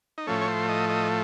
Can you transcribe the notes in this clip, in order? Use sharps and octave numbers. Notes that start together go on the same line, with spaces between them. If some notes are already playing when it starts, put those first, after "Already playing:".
D#4
A2 F3 A3 C#4
C#5
C5
D#5
D#5